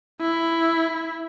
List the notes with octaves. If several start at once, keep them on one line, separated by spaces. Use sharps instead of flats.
E4